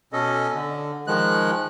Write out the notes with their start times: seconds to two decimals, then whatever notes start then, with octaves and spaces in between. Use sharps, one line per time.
0.13 B2 C#4 A4 D#5
0.54 D3
1.07 D#3 F3 G#3 F#6